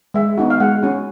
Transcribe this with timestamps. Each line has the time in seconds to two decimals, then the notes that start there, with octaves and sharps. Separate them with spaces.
0.14 G#3 E5
0.38 B3 D#4 F#4
0.50 F5
0.60 G#3 F#5
0.83 C#4 F#4